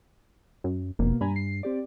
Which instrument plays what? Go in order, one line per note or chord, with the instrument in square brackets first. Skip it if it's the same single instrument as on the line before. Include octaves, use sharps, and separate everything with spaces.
[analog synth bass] F#2
[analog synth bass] F1 [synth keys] B2 A#3
[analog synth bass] G2 [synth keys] G#5 A#5 B5
[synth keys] C7
C4 G4 D5